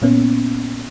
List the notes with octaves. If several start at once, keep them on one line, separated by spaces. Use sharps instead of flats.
A#2 A#3 B3 C#4